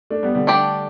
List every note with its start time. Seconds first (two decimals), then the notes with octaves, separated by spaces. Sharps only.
0.10 A3 D4
0.23 G3 B3
0.35 D3 G3
0.47 A3 D4 G4 D5